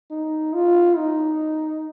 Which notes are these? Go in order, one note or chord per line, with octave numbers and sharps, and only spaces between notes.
D#4
F4
D#4